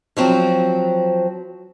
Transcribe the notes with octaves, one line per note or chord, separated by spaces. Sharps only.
F3 F#3 C4